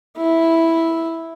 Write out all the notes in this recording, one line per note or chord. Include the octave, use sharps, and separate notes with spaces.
E4